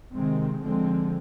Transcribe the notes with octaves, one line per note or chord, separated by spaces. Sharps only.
C3 D#3 G#3 C4
D3 F3 G#3 C4